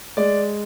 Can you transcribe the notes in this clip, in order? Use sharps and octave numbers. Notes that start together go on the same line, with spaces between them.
G#3 D5